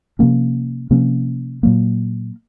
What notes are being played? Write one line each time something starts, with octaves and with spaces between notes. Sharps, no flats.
C3 F3 A#3 C#4
C3 F3 A#3 C#4
A#2 F#3 A#3